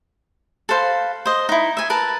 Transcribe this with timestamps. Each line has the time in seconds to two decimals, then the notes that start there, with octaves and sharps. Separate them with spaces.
0.69 A4 B4 C5 F5
1.26 C5 D#5
1.49 D#4 E4
1.77 E5 G#5
1.90 A#4 B4 A5